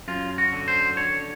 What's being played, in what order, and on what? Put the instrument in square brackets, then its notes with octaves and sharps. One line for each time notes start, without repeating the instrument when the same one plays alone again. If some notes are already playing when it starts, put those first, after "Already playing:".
[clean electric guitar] F#2 F4
F#4
D3
C5
D3 C#5